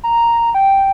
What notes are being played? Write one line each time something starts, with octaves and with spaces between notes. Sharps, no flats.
A#5
G5